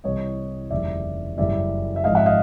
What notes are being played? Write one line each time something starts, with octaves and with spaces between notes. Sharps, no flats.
C2 C3 E3 G3 C#5 D#5
F1 D#2 C#3 E3 G3 D5 E5
F#1 F#2 C#3 E3 G3 D5 E5
E5
G#1 G#2 F3 D#5 F5
E5 F#5
D#5 F5